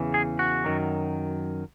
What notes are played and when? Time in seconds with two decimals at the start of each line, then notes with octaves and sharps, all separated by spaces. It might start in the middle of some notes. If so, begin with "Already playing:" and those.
Already playing: E2 C#3 E3
0.14 G#4
0.39 F#4
0.64 F#2 D#3 F#3